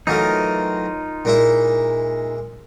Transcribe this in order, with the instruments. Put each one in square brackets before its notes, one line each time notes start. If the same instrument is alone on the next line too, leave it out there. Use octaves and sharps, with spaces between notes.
[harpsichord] E3 F#3 A3 [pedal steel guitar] D#4 F4 A#4
[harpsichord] A#2 G#3 E4